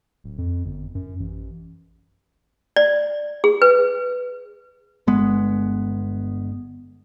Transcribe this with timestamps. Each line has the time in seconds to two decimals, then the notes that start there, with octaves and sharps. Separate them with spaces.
0.24 D1
0.38 F2
0.65 G1
0.95 F#2
1.20 A1
2.76 D5
3.44 G#4
3.62 B4
5.07 G1 G#3 B3